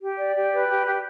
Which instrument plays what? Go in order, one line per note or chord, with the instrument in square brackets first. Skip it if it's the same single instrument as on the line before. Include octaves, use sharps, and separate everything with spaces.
[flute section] G4
D5
G4
B4
G4
G4